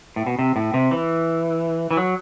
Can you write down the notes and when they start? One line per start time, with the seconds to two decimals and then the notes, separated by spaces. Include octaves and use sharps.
0.16 A2
0.26 B2
0.39 C3
0.56 A2
0.74 C3
0.91 E3
1.91 E3
1.97 F#3